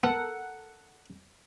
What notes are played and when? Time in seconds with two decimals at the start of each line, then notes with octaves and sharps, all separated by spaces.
0.03 B3 A4 A#4 F#5